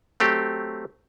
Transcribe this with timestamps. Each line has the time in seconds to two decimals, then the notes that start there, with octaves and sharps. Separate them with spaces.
0.20 F#3 A3 C4 G4